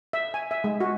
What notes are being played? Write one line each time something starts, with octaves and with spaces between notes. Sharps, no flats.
E5
G#5
E5
G#3
F#4